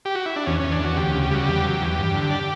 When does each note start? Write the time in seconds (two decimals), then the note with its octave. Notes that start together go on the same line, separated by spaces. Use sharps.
0.05 G4
0.15 F#4
0.26 E4
0.36 D4
0.46 E2 C#4
0.60 E2 C#4
0.72 D4
0.80 E2 F#4
0.96 D2 G4
1.14 C#3
1.22 G4
1.31 G3 F#4
1.46 E2 G4
1.64 F#3
1.81 E2
1.98 G2
2.14 D3
2.31 D5